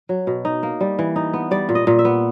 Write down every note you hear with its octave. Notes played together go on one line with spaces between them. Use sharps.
F#3
B2
D#4
A#3
G3
E3
D#4
B3
G3 D5
A#2
D#5
A#2
E5
B3